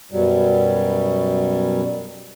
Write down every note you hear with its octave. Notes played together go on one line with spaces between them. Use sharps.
F#2 B2 F#3 G3